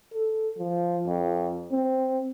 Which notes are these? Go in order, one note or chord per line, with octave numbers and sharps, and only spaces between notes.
A4
F3
F2
C4